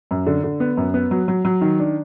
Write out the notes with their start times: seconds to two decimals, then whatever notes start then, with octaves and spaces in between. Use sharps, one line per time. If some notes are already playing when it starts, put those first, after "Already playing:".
0.11 F#2
0.26 D3
0.44 D3
0.60 B3
0.77 F#2
0.94 B3
1.11 F#3
1.28 F#3
1.45 F#3
1.61 D#3
1.79 D4